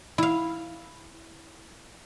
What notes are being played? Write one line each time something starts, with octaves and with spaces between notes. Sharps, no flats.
E4 F5